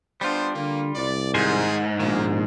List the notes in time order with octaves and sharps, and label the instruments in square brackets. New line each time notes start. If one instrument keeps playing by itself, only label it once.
[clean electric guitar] G3 F4 [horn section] B3 D4 C5
[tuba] D3 [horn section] A#3
[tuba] C2 [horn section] D5
[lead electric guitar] G#2 [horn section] D#3 G#4 [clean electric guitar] A#4 C5 G#5
[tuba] A#1 [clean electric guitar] B2 D#3 [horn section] A#3